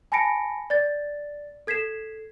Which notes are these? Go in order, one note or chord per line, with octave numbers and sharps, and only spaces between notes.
G#5 A5 B5 A#6 C#7 D7
D5 A6
A4 G#6 B6 C7 E7